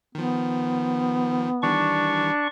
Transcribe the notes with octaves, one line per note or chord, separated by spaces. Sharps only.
D#3 F3 B3
D#3 E3 G3 D4 C#6